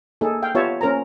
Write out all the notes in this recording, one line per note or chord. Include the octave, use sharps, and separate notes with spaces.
A#3 D#4 G#4 A4
F5 G5
B3 F4 G4 C#5 E5 A5
A#3 C#4 A#4 C5 A#5